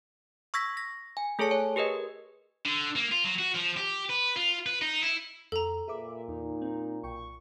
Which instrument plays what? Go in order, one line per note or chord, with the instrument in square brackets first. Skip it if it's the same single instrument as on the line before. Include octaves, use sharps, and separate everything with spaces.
[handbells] C#6 E6 G#6 A#6 B6
A#6
G#5
A3 G#4 A4 C#5 A5 C#7
C#5 G#5
G4 G#4 A#4 B4 D#5
[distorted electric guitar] D3
A#3
F4
F#3
F#4
F3
G4
B4
F4
B4
D#4
E4
[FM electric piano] F2 [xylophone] A4 A#5
[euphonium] A#2 [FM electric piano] G#4 B4 D6 [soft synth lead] E5
[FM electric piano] E2 [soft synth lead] D#4
[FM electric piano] C4
[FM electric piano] B1 G5 [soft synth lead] C#6